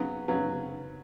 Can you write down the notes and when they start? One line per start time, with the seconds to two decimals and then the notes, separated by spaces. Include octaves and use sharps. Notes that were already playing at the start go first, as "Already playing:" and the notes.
Already playing: C#3 F#3 B3
0.28 C#3 F#3 B3